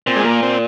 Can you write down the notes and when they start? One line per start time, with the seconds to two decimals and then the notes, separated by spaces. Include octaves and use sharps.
0.07 A#2 C4
0.16 G#3
0.25 A#3
0.42 C4